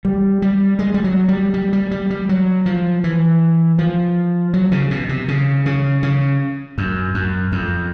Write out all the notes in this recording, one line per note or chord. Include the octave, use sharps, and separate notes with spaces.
G3
G3
G#3
G3
F#3
G3
G3
G3
G3
G3
F#3
F3
E3
F3
F#3
C#3
B2
C3
C#3
C#3
C#3
F#2
F#2
F2